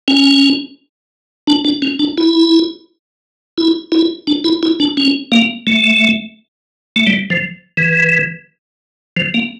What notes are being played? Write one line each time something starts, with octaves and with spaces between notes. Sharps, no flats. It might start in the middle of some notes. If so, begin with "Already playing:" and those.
C#4
D4
D4
C#4
D4
E4
E4
E4
D4
E4
E4
D4
C#4
A#3
A3
A3
G3
F3
E3
F3
A#3